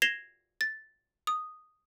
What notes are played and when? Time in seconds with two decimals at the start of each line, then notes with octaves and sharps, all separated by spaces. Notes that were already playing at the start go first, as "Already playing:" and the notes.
0.02 G#6 A#6 C7 E7 F7 G7
0.61 A6
1.27 D#6